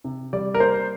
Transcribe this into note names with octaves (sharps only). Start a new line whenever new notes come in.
C3
G3 D5
A#4
A#3 C5